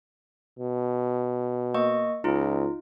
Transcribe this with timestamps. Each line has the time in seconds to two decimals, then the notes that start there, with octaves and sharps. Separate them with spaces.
0.59 B2
1.74 A#3 D#5 C#6
2.24 C#2 D#4 F4